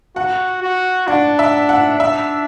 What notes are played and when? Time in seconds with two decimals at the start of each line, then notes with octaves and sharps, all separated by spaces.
0.16 F#4 F#5
0.62 F#4
1.08 D4 F#5
1.39 E5
1.69 F#5
2.00 D4 E5